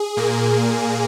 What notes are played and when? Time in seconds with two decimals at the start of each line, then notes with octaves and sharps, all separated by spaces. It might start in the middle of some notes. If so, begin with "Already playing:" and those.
Already playing: G#4
0.17 A#2 A#3